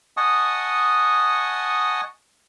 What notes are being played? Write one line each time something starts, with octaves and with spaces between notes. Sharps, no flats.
D#5 F#5 G#5 A5 C#6 D#6